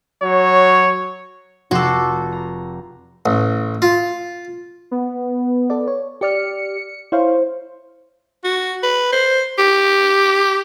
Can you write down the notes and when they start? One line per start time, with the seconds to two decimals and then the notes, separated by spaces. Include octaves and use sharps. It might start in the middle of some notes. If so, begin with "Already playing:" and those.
0.23 F#3 C#5
1.71 F1 F#4 A4 C6 D6
2.33 A#5
3.26 A1
3.82 F4
4.91 B3
5.70 A4 D5
5.88 C#5
6.21 G4 D5 F6 C#7
7.12 E4 C5 C#5 F5
8.44 F#4
8.83 B4
9.13 C5
9.59 G4